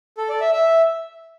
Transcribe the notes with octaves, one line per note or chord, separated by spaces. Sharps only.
A4
D5
E5
E5